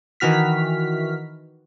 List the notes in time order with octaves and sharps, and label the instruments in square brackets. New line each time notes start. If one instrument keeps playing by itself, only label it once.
[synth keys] D#3 E3 F#4 F6 B6